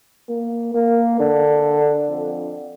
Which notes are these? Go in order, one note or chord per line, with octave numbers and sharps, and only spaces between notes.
A#3
A#3
D3
F2